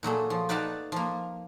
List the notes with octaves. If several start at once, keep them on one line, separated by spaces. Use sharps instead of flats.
A#2 F#3 A3 G#4
F3
D#4 B4 D5 F5 F#5 A5
F3 A#3